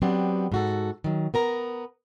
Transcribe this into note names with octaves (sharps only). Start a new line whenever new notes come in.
F#3 B3 C4 D4 G4
G#2 F#4 A4
D#3 F#3
B3 A#4 A#5